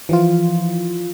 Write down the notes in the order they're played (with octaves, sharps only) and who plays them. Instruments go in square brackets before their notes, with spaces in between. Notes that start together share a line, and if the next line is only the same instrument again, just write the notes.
[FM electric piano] E3 F3 F4